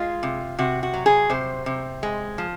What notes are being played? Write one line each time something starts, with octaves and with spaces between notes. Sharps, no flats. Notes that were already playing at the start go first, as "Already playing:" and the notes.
Already playing: G#3 F4
C3
C3 F#4
F#4
F#3
G#4
C3 C5
C3
G#3
F3